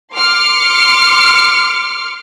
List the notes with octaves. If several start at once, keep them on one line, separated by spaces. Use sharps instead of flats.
C6 D6 F6 C#7